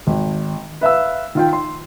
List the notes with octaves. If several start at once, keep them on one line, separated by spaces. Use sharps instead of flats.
G#1
B4 E5 F5 E6
D#3 F4 G5
C6